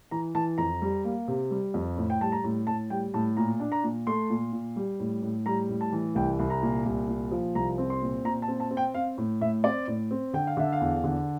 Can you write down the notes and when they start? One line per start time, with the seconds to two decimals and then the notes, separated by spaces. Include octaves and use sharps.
0.11 E3 A#5
0.35 E3 A5
0.58 F2 A#5
0.82 G3
1.05 A#3
1.28 C3
1.51 G3
1.74 F2
1.97 A2
2.10 G5
2.21 G3 A5
2.32 A#5
2.44 A2
2.67 A2 A5
2.90 G3 G5
3.14 A2 A5
3.37 A#2 A#5
3.60 D4
3.72 A#5
3.83 A#2
4.07 A3 C6
4.30 A#2
4.53 A#2
4.76 G3
5.00 A2
5.22 A2
5.46 G3 A#5
5.69 A2
5.81 A5
5.92 E3
6.15 C2 G5
6.39 C2
6.50 A#5
6.62 A#2
6.85 C2
7.08 A#2
7.31 F3
7.55 C2 A#5
7.78 C4
7.90 C6
8.02 A#2
8.24 A#2 A#5
8.42 A5
8.48 C4
8.60 A5
8.71 C4
8.77 G5
8.94 C4 F5
9.18 A2
9.41 A2 E5
9.64 C4 D5
9.87 A2
10.11 C4
10.33 D3 G5
10.47 F5
10.57 D3 E5
10.72 F5
10.81 E2
11.04 D3